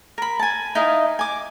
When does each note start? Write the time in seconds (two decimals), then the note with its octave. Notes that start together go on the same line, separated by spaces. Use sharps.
0.18 A#4 B5
0.39 G#5 A5
0.75 D#4 E4 D#5 F5
1.19 G#5 D6